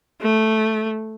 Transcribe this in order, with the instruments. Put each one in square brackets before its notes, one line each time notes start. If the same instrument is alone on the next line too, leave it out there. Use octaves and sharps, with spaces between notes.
[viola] A3